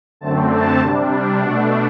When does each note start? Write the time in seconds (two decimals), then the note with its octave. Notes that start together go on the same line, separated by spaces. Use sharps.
0.21 F#2 D3 A3 C4 A5
0.51 A5
0.80 C3 G3 D4
1.39 B2 A3 D4 F#5